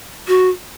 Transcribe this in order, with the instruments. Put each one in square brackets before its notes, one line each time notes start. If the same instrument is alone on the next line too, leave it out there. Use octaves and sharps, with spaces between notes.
[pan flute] F#4